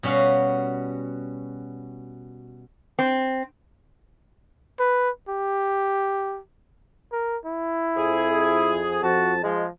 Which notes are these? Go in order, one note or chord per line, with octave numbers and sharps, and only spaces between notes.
B2 G3 C#4 F#4 F5
C4
B4
G4
A#4
E4
F2 G#4
F2 F3 F#4 A5
F3 G#3